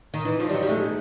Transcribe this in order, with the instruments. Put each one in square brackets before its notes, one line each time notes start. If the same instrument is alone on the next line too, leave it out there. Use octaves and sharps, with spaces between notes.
[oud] D#3
[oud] E3 [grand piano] D#4
[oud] F3
[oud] G3 [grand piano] D#4
[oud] F#3
G3
[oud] G#3 [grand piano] A3